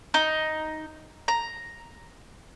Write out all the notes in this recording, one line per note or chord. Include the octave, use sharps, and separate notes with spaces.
D#4
A#5